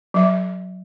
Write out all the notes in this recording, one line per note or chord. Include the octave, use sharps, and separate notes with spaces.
F#3 E5